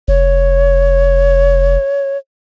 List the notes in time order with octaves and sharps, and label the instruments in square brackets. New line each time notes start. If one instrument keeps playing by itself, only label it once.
[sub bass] F1 [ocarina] C#5